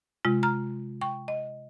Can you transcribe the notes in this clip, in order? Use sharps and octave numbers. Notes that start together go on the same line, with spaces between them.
C3 G#3 F4
A#5 F6
G5 C#6
D#5